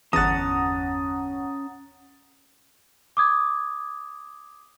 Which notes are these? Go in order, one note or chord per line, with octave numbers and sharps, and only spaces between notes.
G1 E2 C#4 F#5 A5 A#5 D#6 A6
D6 D#6 G#6